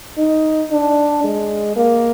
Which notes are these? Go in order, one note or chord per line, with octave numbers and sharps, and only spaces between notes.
D#4
D4
G#3
A#3